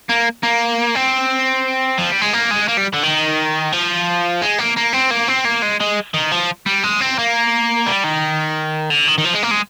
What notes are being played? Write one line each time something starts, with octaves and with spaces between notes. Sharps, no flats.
A#3
A#3
C4
F3
G3
G#3
A#3
G#3
A#3
G3
D3
D#3
F3
G#3
A#3
A#3
C4
A#3
C4
A#3
G#3
G#3
D#3
F3
G3
G#3
C4
A#3
G3
D#3
D3
D#3
D#3
F3
G#3
A#3
G#3